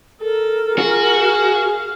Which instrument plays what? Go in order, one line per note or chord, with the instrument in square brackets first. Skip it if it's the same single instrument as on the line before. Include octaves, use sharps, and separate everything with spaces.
[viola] A4 [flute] A#4
[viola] F4 [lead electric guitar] F#4 [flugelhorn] G#4
[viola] F5